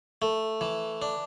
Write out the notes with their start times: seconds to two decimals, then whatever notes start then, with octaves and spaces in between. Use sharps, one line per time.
0.22 A3
0.61 E3
1.02 D4